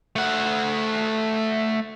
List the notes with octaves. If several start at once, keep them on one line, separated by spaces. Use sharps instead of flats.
A3 F#5